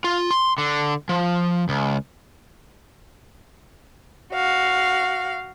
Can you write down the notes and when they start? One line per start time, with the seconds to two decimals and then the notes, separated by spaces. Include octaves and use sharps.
0.04 F4
0.31 C6
0.58 D3
1.09 F3
1.69 C#2
4.33 F#4 F5